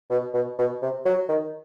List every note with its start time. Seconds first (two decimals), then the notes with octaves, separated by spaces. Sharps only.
0.10 B2
0.34 B2
0.58 B2
0.82 C3
1.05 F#3
1.29 D#3